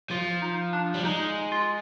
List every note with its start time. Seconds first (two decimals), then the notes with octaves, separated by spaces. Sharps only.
0.10 F3 F4
0.42 D#4
0.73 D4
0.94 G3
1.04 G#3 D#4
1.52 F4